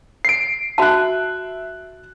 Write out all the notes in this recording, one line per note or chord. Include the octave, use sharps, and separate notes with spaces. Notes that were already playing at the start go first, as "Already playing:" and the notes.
C7 D7
F#4 E5 A5 F#6